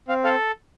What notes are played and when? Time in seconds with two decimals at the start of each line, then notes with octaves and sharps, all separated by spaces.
0.08 C4 F5
0.24 A4 F5